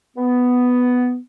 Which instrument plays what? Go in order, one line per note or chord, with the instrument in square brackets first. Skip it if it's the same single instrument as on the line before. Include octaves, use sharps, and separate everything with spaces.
[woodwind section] B3